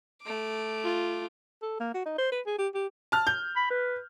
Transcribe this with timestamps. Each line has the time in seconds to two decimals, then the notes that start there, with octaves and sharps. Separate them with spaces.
0.22 A3 D6
0.84 F4
1.62 A4
1.80 A#3
1.94 F#4
2.06 D#4
2.18 C5
2.32 B4
2.46 G#4
2.58 G4
2.74 G4
3.12 A5 F6
3.27 G6
3.56 B5
3.70 B4